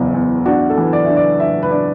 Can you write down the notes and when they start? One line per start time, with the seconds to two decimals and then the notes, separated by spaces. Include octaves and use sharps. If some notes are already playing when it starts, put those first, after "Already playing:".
Already playing: F#1 E2
0.14 E2
0.46 D4 F#4
0.70 A4
0.78 E3
0.93 D5
1.05 D4 E5
1.17 D5
1.40 D4 E5
1.63 B4
1.71 D4 D5